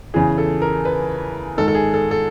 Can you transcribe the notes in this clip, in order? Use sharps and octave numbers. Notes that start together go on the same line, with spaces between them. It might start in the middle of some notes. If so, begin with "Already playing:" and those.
E2 C#3 E3 G#4
A4
A#4
B4
G#2 D#3 A4
A4
G#4
A4
A4